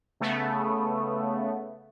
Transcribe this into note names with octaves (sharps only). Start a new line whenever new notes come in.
C#3 A3 B3